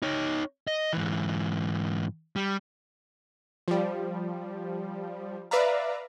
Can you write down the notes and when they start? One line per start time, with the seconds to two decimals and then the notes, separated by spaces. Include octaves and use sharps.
0.02 D#4 C#5
0.68 D#5
0.93 G#2 E3
2.36 G3
3.68 F3 G3
5.51 B4 D5 E5 F5 A#5